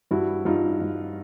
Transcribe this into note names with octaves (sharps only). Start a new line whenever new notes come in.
G2 E4 F#4
G2 D#4 F4
G2